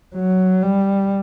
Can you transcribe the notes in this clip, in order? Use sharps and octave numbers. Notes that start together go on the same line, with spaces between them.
F#3
G3